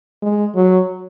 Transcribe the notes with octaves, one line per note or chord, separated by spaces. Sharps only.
G#3
F#3